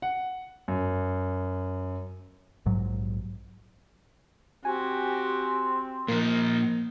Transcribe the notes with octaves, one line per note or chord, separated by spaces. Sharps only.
F#5
F#2
A#1 G#2 F#3
C4 F#4 G4 G#5
A#2 F3 A#3 D#4